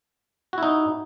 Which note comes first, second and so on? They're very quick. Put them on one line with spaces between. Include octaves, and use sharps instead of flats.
F#4 E4 D#4